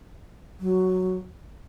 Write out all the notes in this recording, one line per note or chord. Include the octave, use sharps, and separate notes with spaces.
F#3